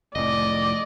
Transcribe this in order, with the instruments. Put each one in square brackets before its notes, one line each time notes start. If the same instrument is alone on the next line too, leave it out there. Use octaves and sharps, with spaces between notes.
[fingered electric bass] F1 A2 [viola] D5 [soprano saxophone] D#5